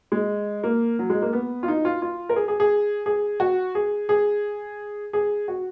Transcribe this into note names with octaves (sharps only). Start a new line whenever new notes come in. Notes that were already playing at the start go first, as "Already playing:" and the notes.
G#3
A#3
F#3
G#3
A#3
B3
F4
D#4
F4
F4
A#4
G#4
G#4
G#4
G#4
F#4
G#4
G#4
G#4
F#4